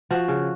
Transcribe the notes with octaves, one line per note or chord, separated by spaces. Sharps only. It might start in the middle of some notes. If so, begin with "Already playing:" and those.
F3 F#4
C#3